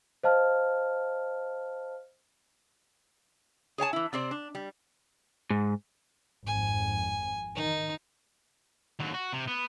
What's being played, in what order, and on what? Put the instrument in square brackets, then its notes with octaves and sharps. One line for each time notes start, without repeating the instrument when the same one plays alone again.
[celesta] C5 D#5 F5 A5 F6
[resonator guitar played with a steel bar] G#4 C#5 G#5 A5
E3 E4
C3 C4 C5 D5
D4
G3
[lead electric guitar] G#2
[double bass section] G#1 F2 [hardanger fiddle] G#5
[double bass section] D#3 [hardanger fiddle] D#4
[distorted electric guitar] D#2 F#3
F#4
C3
B3